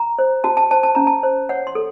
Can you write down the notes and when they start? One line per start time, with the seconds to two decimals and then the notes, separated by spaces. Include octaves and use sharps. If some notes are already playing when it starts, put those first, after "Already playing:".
Already playing: A#5
0.19 C5
0.44 F#4 A5
0.57 A5
0.71 C5 A5
0.83 A5
0.95 C#4 A#5
1.07 A5
1.23 C5
1.49 C#5 F#5
1.67 C6
1.75 A4